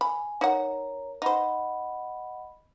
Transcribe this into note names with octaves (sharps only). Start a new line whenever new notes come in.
G#5 B5
D#4 A#4 C#5 F#5 A#5
D#4 C5 D#5 F#5 B5